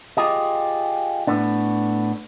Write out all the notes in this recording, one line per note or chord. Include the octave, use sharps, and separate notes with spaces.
F4 G4 G#4 D#5
A2 A3 B3 D4